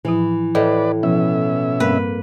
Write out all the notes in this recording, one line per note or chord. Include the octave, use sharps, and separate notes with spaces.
A2 E3 F3 E4
A2 B4 D5 D#5
B2 F3 C#4 E5
G2 G3 A#3 C4 B4